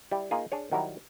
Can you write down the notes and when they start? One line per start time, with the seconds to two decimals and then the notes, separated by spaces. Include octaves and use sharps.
0.11 G3 E4
0.31 A#3 D#4 F4 G#4
0.52 D4 G#4 C#5
0.72 D#3 F#3 G3 E4 A#4